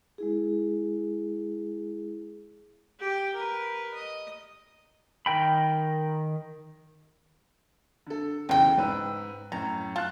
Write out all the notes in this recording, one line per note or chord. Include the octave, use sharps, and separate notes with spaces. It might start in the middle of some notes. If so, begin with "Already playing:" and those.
G#3 E4 G#4
G4 G5
A#4 B4
D#5
D#3 A#4 G5 B5
D3 A4
B1 E2 C#3 C4 G5
G#2 B4 E6
F#2 A2 A#5
F4 A5 F#6